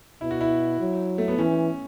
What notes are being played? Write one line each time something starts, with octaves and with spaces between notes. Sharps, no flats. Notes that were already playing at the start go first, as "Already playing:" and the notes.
B2 E4
F#4
E4
F#3
A3
B3
E3 C#4